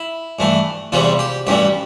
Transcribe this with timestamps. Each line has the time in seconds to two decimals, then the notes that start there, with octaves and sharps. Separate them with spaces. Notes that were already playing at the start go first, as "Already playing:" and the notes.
Already playing: E4
0.39 G2 E3 A3
0.92 E2 C3 E3 G3 F4
1.19 G4
1.47 A1 G2 E3 G3 G4